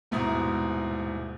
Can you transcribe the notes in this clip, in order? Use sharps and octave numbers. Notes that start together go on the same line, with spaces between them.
D#1 G#2 B2 E4 A#5